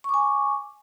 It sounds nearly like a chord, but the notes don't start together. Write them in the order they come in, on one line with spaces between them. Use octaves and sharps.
C#6 D6 G#5